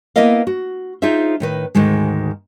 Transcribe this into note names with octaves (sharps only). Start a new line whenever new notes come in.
A#3 B3 E4 A#4 D#5 F5
F#4
D#4 F4 G#4 C5 E5
A2 D#3 B4
D2 G#2 D#3 G#3